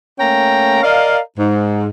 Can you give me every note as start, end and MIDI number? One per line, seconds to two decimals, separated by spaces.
0.18 0.81 57
0.18 0.81 58
0.18 0.81 61
0.18 0.81 79
0.18 0.81 82
0.83 1.18 70
0.83 1.18 74
0.83 1.18 75
0.83 1.18 77
1.38 1.86 44